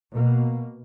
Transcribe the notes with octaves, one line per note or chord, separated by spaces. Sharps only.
B2 A#3